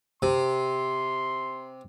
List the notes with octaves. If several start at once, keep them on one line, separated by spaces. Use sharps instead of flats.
C3 C6